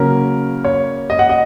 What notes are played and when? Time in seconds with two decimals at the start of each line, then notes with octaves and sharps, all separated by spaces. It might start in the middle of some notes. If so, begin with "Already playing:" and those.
Already playing: C#3 F#3 A#3 C#4 A#4
0.65 C#5
1.10 D#5
1.19 F#5
1.29 D#5